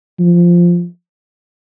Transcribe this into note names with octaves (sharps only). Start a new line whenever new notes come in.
F3